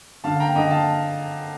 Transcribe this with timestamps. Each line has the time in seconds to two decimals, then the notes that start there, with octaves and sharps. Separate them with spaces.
0.24 D3 F5 A5
0.40 G5 A#5
0.55 D3 D#5 G5
0.71 F5 A5